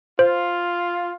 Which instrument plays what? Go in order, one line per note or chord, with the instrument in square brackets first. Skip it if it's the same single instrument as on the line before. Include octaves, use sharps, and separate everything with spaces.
[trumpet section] F4 [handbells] C5